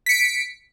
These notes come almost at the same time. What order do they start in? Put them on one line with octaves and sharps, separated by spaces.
B6 C#7 D7